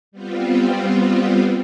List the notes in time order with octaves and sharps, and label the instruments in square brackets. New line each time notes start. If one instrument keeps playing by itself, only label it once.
[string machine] G3 B3 C4 F4